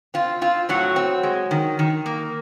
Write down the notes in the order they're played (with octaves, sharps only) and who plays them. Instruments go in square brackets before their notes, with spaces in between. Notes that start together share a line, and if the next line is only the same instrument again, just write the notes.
[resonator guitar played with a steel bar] C4 F4
C4 F4
A2 F#3 F#4
C4
G#3
D#3
D#3
A#3